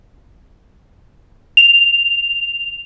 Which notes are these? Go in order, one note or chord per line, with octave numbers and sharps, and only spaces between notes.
F7